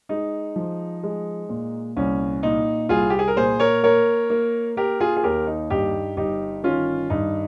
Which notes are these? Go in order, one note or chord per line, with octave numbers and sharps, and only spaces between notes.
G#3 D#4
F3
G#3
A#2
C2 C#4
A#2 D#4
C2 F4 G#4
G4
G#4
A#4
A#2 G#4 C5
A#4 C#5
A#3 A#4 C#5
A#3
A#3 G4 A#4
F4 G#4
G#4
D#2 G4 A#4
D#4
G2 D#4 G4
G1 D#4 G4
D#3 C#4 F4
G2 D#4